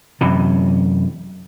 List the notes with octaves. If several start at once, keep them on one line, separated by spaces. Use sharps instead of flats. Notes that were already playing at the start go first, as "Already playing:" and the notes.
F#2 C3 E3